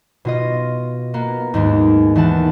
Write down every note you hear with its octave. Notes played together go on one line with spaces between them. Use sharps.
B2 F4 D#5
A#3 B3
D#2 G#2 G#3
D#2 E3 F#5 A5